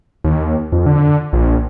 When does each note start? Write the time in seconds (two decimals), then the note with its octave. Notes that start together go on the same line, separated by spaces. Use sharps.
0.24 D#2
0.72 F2
0.86 D3
1.33 A#1